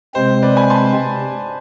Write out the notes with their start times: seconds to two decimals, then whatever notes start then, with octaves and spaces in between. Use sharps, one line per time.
0.15 C3 G#3 C4 C5
0.43 B4 D5
0.56 G#5 B5
0.70 A5 C6